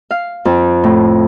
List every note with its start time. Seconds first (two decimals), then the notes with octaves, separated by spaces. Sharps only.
0.11 F5
0.45 F2
0.84 A2